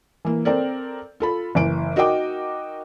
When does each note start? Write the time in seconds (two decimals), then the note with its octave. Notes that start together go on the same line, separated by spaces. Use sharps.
0.25 E3 A#3
0.45 C4 A4 A#4 D5
1.20 F4 A4 B5
1.55 F#1 E3 D7
1.96 D#4 F#4 A#4 D#5 G5 D6